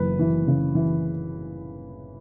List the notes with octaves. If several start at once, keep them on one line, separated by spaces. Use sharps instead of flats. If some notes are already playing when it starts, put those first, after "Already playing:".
Already playing: F#1 E3 B4
E3
C#3
E3